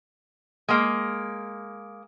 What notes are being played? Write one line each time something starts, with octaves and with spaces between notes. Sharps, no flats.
G#3 A#3